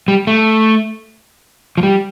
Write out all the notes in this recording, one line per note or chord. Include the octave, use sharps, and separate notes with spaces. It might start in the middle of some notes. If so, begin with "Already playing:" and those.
G3
A3
F3
G3